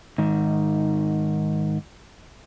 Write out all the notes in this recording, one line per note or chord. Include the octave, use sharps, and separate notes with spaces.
G#2 D#3